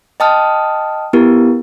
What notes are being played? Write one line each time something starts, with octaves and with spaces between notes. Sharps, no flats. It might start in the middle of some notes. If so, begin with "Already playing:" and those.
D#5 G5 A5 D#6 F6
B3 E4 G4 A#4